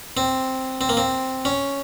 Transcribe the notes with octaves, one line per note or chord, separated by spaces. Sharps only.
C4
C4
A#3
C4
C#4